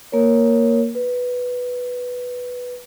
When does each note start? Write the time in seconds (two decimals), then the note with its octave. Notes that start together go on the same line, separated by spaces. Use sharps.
0.12 A#3 A#4 C#5
0.95 B4